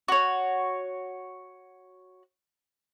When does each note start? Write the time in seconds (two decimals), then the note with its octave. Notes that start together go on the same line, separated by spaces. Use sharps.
0.08 F#4 C#5